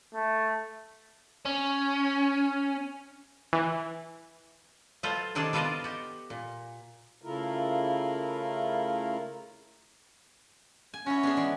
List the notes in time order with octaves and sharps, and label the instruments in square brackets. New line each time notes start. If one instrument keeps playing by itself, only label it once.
[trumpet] A3
[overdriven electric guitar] C#4
[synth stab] E3
[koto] F#3 F4 A4 B4 C5
C3 D#3 D4 G#4 A4 A5
B3 F4 A4 B4 D5 D#5
F#4 G4
A#2
[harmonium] C#3 A3 E4 F4 A#4
[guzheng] G#5
[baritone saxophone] C#4 [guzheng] E4 F#4
[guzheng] B3 D4 G#4
E3 G#3